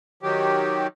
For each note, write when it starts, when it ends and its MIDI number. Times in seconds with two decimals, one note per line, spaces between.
0.23 0.87 51
0.23 0.87 54
0.23 0.87 67